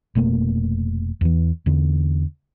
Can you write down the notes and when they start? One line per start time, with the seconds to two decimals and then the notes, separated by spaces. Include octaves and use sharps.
0.15 F1 B2 A3 A#3
1.21 E2 E3
1.66 E2 D3